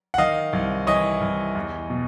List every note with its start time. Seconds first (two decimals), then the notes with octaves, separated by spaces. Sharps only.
0.14 F#5
0.18 D#3 D#5 F5
0.53 C2
0.87 E3 C#5 D#5
1.21 C2
1.55 E2
1.90 B2